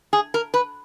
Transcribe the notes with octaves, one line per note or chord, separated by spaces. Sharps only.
G#4
A#4
B4